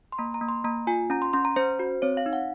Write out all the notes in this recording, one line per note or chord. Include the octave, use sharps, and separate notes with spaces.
C6
A#3 A#5
A#5
A#3
C6
A#3 A#5
F4 G#5
C#4 A#5
C6
C#4 C6
A#5
C#4 C5
F#4
C4 C#5
F5
D#4
F#5